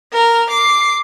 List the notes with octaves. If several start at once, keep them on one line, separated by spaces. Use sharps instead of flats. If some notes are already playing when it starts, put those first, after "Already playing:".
A#4 F6
D6 C7